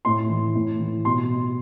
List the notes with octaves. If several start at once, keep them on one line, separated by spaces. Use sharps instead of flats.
A2 C6
E3
A2
E3
B2 C6